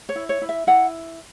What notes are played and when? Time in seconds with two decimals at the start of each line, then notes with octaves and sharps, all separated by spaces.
0.09 C#5
0.16 E4
0.29 C#5
0.42 E4
0.49 E5
0.67 E4 F#5